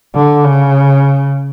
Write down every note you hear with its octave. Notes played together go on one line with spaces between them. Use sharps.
D3
C#3